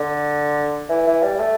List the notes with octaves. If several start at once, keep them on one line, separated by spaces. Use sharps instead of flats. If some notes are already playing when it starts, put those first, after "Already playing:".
Already playing: D3
E3
E3
G3
A3